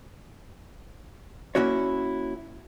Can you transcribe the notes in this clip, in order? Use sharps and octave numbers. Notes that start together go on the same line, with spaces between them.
A#3 C#4 E4 F#4 C#5